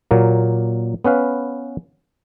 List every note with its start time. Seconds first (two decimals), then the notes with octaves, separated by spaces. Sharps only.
0.11 A#2 F#3 A#3
1.04 B3 C#4 B4 F5